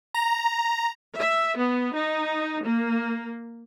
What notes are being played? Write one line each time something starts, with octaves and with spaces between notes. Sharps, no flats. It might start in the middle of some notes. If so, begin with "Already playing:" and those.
A#5
E5
B3
D#4
A#3